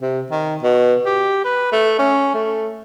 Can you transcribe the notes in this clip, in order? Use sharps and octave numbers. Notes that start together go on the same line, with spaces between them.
C3
D#3
B2
G4
B4
A3
C#4
A3